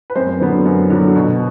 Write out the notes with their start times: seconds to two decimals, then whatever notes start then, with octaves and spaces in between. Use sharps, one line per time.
0.10 B4
0.15 F#2 C4 C5
0.41 D3 F#3 B3
0.66 F#2
0.90 D3 F#3 B3
1.16 B2